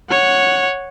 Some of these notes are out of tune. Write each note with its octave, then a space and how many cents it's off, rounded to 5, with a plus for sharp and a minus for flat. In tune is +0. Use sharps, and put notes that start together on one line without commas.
C#5 +0 F#5 -5